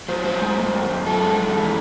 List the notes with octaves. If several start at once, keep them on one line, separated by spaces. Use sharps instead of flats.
F#3 C5
A2 C5
G#3
F#2
F#2
F#2
F#2 A4
G#3
F#2
E3